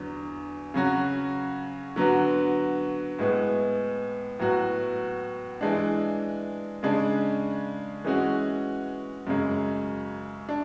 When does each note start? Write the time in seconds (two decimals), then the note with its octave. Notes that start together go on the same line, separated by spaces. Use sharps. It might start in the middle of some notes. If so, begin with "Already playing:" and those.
Already playing: E2 D3 F#3
0.74 C#3 F#3 C#4 F#4
1.96 D3 F#3 B3 F#4
3.18 A2 G#3 B3
4.39 A2 F#3 B3 F#4
5.61 E3 G#3 D4
6.83 C#3 G#3 D4
8.05 E3 G#3 C#4 F#4
9.27 F#2 C#3 G#3
10.49 D4